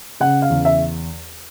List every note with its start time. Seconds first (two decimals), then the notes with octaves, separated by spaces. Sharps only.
0.20 C#3 F#5
0.42 F5
0.50 E2
0.65 E5